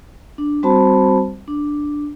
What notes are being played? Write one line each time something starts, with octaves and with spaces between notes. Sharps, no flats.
D4
G3 C4 F#4 C5 A5 B5
D4